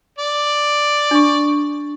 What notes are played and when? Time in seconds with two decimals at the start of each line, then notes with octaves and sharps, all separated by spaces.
0.19 D5
1.11 D4 C#6